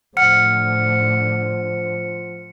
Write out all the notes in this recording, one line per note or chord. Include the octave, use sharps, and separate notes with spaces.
A2 D3 F3 C5 F#5 F6 C#7